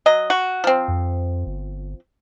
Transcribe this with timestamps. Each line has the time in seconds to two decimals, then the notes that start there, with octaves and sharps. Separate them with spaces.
0.06 F#3 D#5
0.30 F#4
0.64 F3 C4
0.88 F2
1.46 G1